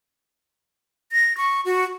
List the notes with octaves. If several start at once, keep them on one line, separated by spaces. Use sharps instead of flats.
A#6
C#6
F#4